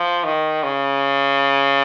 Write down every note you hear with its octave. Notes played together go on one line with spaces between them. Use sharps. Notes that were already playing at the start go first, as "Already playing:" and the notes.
Already playing: F3
D#3
C#3